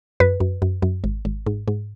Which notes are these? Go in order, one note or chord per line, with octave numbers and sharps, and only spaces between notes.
F#2 B4
F#2
F#2
F#2
G#1
G#1
G#2
G#2